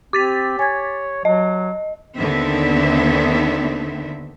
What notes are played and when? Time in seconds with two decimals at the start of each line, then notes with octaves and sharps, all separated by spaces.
0.13 C4 G4 D6 A6 B6
0.59 C#5 G#5 G#6
1.25 F#3 D#5
2.17 D#2 D3 D#3 B3 C4 E5